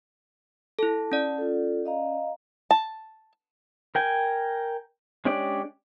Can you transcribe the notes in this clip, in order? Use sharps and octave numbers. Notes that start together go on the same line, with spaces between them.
E4 A4 A5
C#4 D5
F4 A4
D#5 F5 A#5
A5
A#4 G5 G#5
G#3 C#4 D4 G4 D5